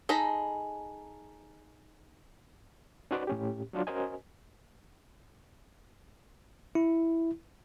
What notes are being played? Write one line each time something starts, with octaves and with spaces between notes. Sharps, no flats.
D#4 G#4 A4 A#5 B5
C#4 D#4 F#4 B4 C5 D5
A2 C#4 G4
F#3 D4 F4
C#4 F#4 A#4 C5 D#5 G#5
E4